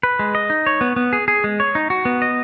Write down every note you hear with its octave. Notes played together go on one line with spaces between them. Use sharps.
B4
G#3
D#5
D#4
C#5
B3
B3
G#4
G#4
G#3
C#5
D#4
F#4
B3
D#5